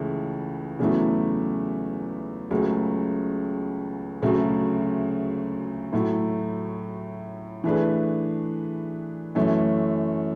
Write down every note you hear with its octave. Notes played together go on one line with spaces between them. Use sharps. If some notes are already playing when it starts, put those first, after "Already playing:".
Already playing: C#2 C#3 E3 A3
E2 C#3 F#3 A3 E4
C#2 C#3 F#3 A3
D2 C#3 F#3 A3
A2 F#3 A3 E4
E3 A3 D4 G#4 B4
F#2 E3 A3 C#4